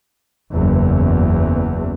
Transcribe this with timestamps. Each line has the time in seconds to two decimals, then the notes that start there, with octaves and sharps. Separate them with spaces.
0.53 F#1 E2